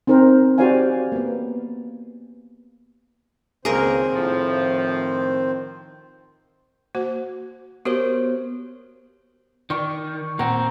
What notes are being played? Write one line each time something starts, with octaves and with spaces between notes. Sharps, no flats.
C4 D#4 A#4 C5
F#4 G4 C5 D5 F5 G#5
A#3 B3
C#2 D#3 A#3 C4 G#4 A#4 C5
A2 F3
A#3 F#4 C5
B3 F#4 G4 A#4 C5 C#5
D#3 D5 C#6
A#2 C4 F#5 A#5